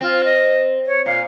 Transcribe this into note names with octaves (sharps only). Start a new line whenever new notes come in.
C4 F4
D#5
C#5
A#2 F5